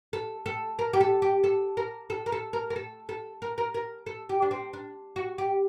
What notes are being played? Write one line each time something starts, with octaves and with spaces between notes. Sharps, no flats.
A4
A4
A#4
G4
A4
G4
A4
A#4
A4
A#4
A4
A#4
A#4
A4
A4
A#4
A#4
A#4
A4
G4
D4
C4
D4
F#4
G4